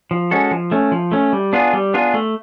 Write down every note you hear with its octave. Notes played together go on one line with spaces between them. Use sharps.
F3
G#3 C#4 F#4 A4
F3
A3 C#4
F3
A3 C#4
G3
B3 D4 F4 G#4
G3
B3 D4 F4 G#4
A3